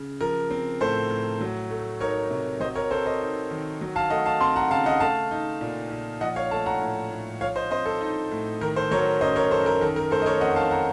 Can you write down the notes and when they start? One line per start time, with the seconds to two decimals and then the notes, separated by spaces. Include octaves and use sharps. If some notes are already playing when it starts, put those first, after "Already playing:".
Already playing: C#3
0.21 F3 A#4
0.51 C4
0.81 A2 A4 C5
1.10 A2
1.41 F#3
1.70 A3
2.00 D#4 A#4 C#5
2.31 C3
2.60 F#3 C5 D#5
2.75 A#4 C#5
2.91 C4 A4 C5
3.06 C5 D#5
3.21 D#4
3.51 D#3
3.81 F#3
3.96 F5 A5
4.10 A3 D#5 F#5
4.25 F5 A5
4.41 C4 A5 C6
4.56 F#5 A#5
4.71 C#3 F5 A5
4.86 D#5 F#5
5.00 A3 F5 A5
5.31 D#4
5.61 A#2
5.91 A#2
6.21 F3 D#5 F#5
6.36 C#5 F5
6.51 A3 F5 A5
6.66 F#5 A#5
6.81 A2
7.11 A2
7.41 F3 C#5 F5
7.56 C5 D#5
7.71 C4 C5 D#5
7.86 A4
8.01 D#4
8.31 A2
8.61 D#3 A#4
8.76 A4 C5
8.91 F#3 A#4 C#5
9.21 F#2 C5 D#5
9.36 A#4 C#5
9.51 F#2 A4 C5
9.66 A#4
9.81 D#3 A4
9.96 A#4
10.11 A3 A4 C5
10.22 D#5
10.26 A#4 C#5
10.41 F2 D#5 F#5
10.56 F5 A5
10.71 F#5 A#5